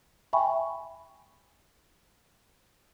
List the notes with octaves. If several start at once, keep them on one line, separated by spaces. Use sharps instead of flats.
E5 G5 G#5 B5 C#6